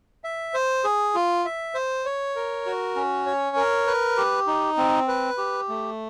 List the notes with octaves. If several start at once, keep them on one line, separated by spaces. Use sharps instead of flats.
E5
C5
G#4
F4
E5
C5
C#5
A#4
F#4
C#4
C#5
A#4
B4
G4
D#4
C4
B4
G4
A3